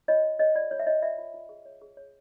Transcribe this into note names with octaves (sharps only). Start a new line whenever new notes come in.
F4 C#5 D#5
C#5
G#4 C#5 D#5
F4 D5
F4 C#5
E5
F4 C#5 D#5
F4 D5 E5
F4
F4
G#4
C#5
G#4
C#5